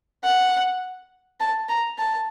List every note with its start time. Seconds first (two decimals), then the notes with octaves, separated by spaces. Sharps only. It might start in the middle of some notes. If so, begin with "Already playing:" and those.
0.24 F#5
1.40 A5
1.69 A#5
1.98 A5